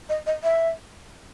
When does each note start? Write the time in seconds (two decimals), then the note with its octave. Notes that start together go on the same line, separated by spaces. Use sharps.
0.09 D#5
0.26 D#5
0.43 E5